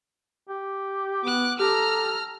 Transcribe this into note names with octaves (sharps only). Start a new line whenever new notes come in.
G4
B3 D6 F#6
G4 A4 A#5 F6